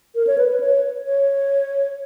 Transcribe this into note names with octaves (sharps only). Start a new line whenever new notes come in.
A#4
C#5
B4
B4
C#5
C#5